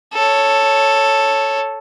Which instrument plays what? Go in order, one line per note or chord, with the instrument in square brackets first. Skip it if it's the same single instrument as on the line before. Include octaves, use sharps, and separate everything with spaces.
[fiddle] A4 C#5